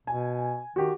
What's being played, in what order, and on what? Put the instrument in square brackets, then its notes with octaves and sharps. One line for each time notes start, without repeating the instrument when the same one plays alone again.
[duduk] B2 [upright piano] G#5
[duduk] D#3 [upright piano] F#4 G4